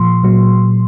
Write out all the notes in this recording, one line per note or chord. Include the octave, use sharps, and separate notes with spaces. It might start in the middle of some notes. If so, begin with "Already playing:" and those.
Already playing: A#2 F3 C6
A#2 F#3